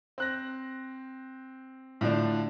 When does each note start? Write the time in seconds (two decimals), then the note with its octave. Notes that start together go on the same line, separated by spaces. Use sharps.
0.18 C4 F#6 A#6
2.01 A2 D3 F3 D4